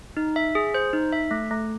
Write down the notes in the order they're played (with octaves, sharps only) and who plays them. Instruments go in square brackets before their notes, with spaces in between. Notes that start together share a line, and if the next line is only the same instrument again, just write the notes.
[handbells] D#4
E5
G#4
C5
D#4
E5
A3
A3